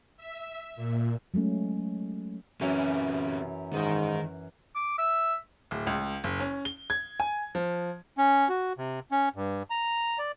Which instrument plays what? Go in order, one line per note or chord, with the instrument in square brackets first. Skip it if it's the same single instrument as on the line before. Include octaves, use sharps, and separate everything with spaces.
[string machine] E5
A#2
[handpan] F#3 G#3 A3 C#4
[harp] F#2 E3 [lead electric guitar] C3 C#4
[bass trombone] G#2 [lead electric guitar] D#3 D#4
[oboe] D6
E5
[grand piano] D1
C#2
F#1
C#4
G7
G#6
G#5
F3
[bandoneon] C#4
F#4
C3
C#4
G2
A#5
D5